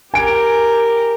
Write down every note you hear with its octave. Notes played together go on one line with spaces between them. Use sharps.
G4 A#4 G#5 D7